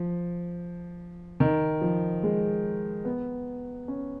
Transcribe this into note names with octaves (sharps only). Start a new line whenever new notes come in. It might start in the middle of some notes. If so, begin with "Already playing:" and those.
Already playing: F3
D#3
F3
G#3
B3
C#4